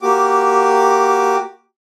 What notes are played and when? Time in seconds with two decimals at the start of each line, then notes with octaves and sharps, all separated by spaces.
0.02 A#3 F#4 G4 D6